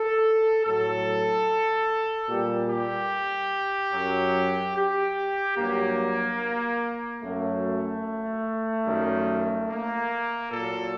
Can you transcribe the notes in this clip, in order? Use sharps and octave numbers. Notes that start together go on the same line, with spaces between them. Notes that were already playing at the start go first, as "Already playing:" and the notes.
Already playing: A4
A2 F#3 A4
A#2 G3 G4
G4
F#2 F#3
G4
G2 F#3 A#3
F#2 F#3 A3
F#2 D#3 G3
A#3
A#2 F#3 A4